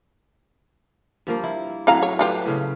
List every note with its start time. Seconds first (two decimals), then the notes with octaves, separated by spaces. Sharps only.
1.27 G2 F3 A#3
1.44 E4
1.87 A2 F#3 C4 F5 A#5
2.02 C#5
2.19 G3 A3 D4 F4 G4 B4
2.46 A2 C#3